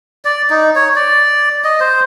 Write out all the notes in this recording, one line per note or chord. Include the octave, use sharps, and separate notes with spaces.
D5
D#4
C#5
D5
D#5
C5